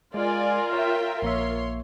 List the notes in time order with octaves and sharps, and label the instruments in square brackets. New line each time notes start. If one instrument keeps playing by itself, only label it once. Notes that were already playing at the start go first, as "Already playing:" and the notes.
[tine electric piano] G#3 [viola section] F4 A#4 [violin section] D5 G#5
[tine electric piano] C#5 [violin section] E5 G5
[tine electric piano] A#1 A#3 E5 [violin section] C#5 C6